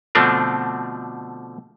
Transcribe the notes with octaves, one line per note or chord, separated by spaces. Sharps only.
B2 D3 F3 A3 C4 D4